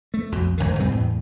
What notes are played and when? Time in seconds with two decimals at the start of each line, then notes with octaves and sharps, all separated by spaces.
0.14 A3
0.32 B1 F2 B2
0.58 G#1 D2 D3 D#3
0.80 G2 B2 G3 C4
0.92 E2 A2 E3